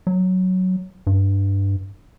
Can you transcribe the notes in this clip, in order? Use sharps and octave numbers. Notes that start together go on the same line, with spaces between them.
F#3
G2